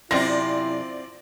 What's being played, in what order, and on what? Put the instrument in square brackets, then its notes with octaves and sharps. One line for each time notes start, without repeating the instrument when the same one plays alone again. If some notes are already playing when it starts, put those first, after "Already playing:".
[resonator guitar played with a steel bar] F#2 C3 [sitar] C4 F4 [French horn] E4 [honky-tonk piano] D5 A#6